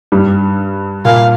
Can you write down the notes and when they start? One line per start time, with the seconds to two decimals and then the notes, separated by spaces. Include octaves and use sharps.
0.12 G2 G3
1.05 A#2 A#3 F5